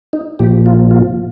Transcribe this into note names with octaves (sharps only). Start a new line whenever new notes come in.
D#4
A#2 F3 G4
F4
F4